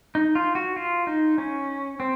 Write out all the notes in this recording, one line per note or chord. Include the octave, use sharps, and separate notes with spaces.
D#4
F4
F#4
F4
D#4
C#4
C4